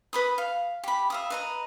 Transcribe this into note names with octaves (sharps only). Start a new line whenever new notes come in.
B4 B5 D#6
F5
G4 B5
E5 F5 D#6
B4 D#5 A#5